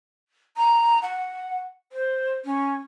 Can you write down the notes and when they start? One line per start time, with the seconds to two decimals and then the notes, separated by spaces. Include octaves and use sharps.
0.57 A#5
1.02 F#5
1.92 C5
2.45 C#4